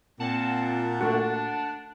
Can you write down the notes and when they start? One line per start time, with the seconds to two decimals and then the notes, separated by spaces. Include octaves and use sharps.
0.20 A#2 C4 F#5 A5
1.01 A3 D4 F#4